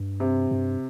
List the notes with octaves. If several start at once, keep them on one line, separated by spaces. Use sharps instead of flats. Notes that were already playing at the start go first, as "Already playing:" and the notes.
Already playing: G2
C3
G2